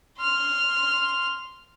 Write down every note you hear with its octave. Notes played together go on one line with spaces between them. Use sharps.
C6 F6